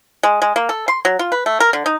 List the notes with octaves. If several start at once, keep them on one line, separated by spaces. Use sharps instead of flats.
G#3
G#3
A#3
A4
C6
F#3
F4
B4
A3
A#4
D3
D#4